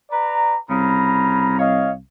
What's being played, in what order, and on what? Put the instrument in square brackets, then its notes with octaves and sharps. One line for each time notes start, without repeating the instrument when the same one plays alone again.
[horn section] B4 D5 A#5
[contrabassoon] C2 [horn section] C#3 A#5 B5
[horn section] C#5 D#5 F5